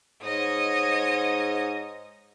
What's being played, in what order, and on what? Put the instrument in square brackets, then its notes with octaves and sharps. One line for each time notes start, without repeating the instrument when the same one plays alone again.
[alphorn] G#2 [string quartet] C#5 D#5 D#6